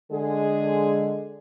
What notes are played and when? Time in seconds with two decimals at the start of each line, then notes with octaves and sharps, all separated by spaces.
0.12 D3 G#3 G#4